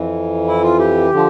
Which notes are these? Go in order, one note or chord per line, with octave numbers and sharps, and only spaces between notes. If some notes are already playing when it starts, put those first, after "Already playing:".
Already playing: F2 E3
E4
F4
G4
D3 F3